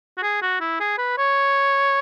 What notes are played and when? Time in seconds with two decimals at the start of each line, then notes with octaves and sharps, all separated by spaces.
0.17 F#4
0.23 G#4
0.42 F#4
0.60 E4
0.80 G#4
0.98 B4
1.18 C#5